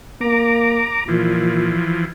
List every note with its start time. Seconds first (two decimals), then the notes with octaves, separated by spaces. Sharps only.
0.21 A#3 A#5 D6
1.08 A#2 E3 F3